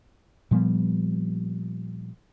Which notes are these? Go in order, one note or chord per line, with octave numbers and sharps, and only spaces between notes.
A#2 F3 G3 B3